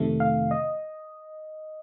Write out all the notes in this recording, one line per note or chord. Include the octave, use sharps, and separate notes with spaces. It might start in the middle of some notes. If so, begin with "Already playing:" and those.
Already playing: F2 C3 D#3 A3
F5
D#5